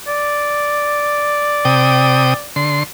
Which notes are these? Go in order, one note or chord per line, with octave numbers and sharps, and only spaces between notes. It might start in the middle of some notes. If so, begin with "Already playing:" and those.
D5
C3 G5 D#6
D3 C6